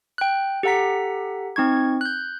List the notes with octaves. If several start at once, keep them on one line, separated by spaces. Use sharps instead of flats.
G5 F#6
G4 A4 F#5 A#5 B6
C4 D#4 C#6 G#6
F#6 G6